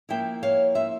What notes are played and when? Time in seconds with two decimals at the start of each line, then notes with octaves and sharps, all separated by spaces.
0.09 F3 A#3 E4 E5 G5
0.43 C#5 F5
0.75 C5 E5